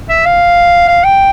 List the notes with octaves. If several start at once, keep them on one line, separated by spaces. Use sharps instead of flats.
E5
F5
F5
G5